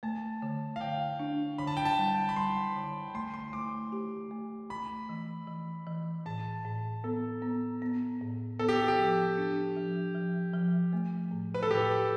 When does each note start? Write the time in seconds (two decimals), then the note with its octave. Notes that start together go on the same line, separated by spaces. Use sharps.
0.03 A3 A5
0.42 D3
0.76 F5
0.81 D3 G5
1.20 D4
1.58 D3 B5
1.67 A5
1.77 G5
1.85 A5
1.98 G3
2.29 B5
2.36 G3 C6
2.76 D3
3.14 A3 C6
3.34 C6
3.53 A3 D6
3.92 G4
4.31 A3
4.70 A3 B5
5.09 E3
5.48 E3
5.87 E3
6.26 A2 A5
6.65 A2
7.04 B3 A4
7.42 B3
7.82 B3
8.21 A2
8.59 B3 A4
8.69 G4
8.88 G4
8.98 F3
9.38 D4
9.76 F3
10.15 F3
10.53 F3
10.93 A3
11.31 A2
11.54 B4
11.63 A4
11.71 A2 G4